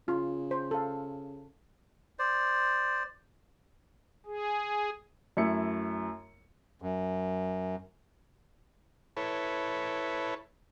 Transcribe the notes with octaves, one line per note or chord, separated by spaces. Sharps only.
C#3 F4
C5
A4 F5
C5 D5
G#4
F#2 A3 E4 C#7
F#2
E4 A4 B4 C#5